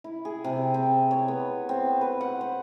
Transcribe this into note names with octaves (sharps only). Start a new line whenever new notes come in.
E4
G#4
C3
C4
C#5
B3
C4
B4
F#5
C5